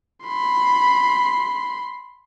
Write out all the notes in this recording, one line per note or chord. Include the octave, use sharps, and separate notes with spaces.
B5 C6